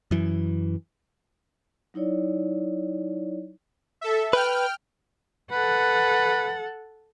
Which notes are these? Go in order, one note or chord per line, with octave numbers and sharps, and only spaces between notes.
F#2 E3
F#3 D#4 E4 C#5 D5
A4 E5
B4 G5 F6
A4 B4 F#5